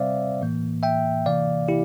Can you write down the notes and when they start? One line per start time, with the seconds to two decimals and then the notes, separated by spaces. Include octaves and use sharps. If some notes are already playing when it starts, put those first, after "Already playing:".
Already playing: C3 G3 C4 C5 D5 E5 F5
0.41 A2 E3 A#3
0.83 E5 G5
1.26 C3 E3 A#3 D5 F5
1.68 E4 G4